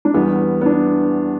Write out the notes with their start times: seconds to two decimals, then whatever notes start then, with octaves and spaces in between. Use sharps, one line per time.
0.05 D4
0.14 E2 E3 G3 B3
0.61 B3
0.66 D4